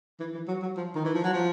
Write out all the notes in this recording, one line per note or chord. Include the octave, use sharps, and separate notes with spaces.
E3
E3
F#3
F#3
F3
D#3
E3
F3
F#3
F3